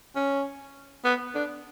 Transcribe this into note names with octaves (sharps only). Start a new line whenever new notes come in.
C#4
B3
D4